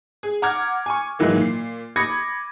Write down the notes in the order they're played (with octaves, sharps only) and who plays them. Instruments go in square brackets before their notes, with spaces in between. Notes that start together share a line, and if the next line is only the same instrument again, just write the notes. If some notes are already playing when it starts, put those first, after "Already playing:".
[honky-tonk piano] G#4
F#5 A#5 D6 F6 G#6
G#5 C#6
G#2 D#3 E3 F#3 A#3
A#2 C7
B5 D6 D#6 G#6 A#6 C#7